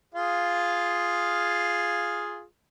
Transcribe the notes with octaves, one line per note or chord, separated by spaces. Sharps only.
F4 G#4 F5